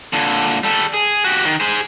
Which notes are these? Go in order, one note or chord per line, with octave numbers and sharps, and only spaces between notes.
A#2 D3
G3 A4
G#4
F#4 G4
D#3
G#4 C5